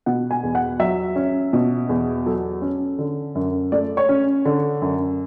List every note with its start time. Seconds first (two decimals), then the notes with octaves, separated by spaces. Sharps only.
0.06 B2 F#5
0.31 G#5
0.43 E2
0.55 F#5
0.79 F#3 E5
1.16 C#4
1.53 B2
1.89 E2
2.26 F#3 A4
2.62 C#4
2.99 D3
3.35 F#2
3.72 A3 D5
3.97 C#5
4.09 C#4
4.45 D3
4.82 F#2